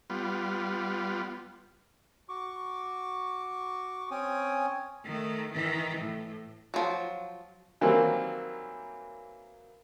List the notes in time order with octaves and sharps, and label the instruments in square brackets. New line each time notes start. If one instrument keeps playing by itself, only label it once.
[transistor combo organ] G3 B3 F4
[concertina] F#4 C#6 D6
C4 C#4 C#5 G5 G#5 D#6
[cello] D#3 A3
D#3 E3
A2
[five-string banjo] F3 F#3
[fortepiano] D#3 E3 F#3 G3 A#3 C4